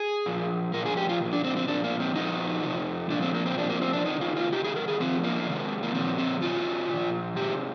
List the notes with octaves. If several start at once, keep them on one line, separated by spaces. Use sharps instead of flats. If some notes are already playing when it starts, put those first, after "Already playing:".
Already playing: G#4
A#2 F3
A#2 F3 A#4
G#4
G4
F4
A#2 F3
D4
C4
C4
A#2 F3 D4
A#3
C4
A#2 F3 D#4
C3 F3
A#2 F3 D4
C4
A#3
C4
C3 F3 D4
A#3
C4
D4
C3 D#3 D#4
F4
F4
C3 D#3 G4
G#4
A#4
G#4
C3 F3 C4
A#3
C3 D#3
A#3
A#2 F3 C4
C4
C3 D#3 F4
A#2 F3
C3 D#3 G4